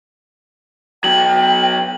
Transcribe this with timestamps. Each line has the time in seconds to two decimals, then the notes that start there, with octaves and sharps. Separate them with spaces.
1.04 B2 F#3 G5 F#7